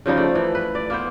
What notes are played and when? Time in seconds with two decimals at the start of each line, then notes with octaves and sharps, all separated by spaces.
0.06 C#3 F3 G3 D#4
0.17 A3 D5
0.35 E3
0.55 B4
0.75 D5
0.90 A#3 B3 C5